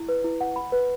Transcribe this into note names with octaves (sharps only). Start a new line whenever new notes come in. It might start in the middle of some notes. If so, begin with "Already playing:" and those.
Already playing: E4
B4
E4
F#5
B5
B4